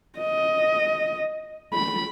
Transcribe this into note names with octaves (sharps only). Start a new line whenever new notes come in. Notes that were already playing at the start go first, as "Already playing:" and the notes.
D#5
B5